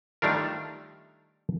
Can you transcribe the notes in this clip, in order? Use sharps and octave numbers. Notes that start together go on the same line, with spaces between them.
D#3 G3 A3 D4 F4 A#4